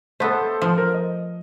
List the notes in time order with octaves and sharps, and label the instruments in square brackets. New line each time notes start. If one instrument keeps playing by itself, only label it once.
[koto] A3 B3 [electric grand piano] A4 C5
[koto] F3
[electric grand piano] A#4
D#5